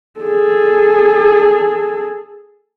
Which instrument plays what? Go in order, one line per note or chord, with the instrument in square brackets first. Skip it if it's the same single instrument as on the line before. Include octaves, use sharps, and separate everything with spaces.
[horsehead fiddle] G#4 A4